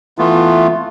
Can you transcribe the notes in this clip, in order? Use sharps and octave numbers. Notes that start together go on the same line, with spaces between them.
E3 A3 B3 F4